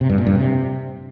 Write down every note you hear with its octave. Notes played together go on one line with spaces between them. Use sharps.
C3
G2
A#2
G2
C3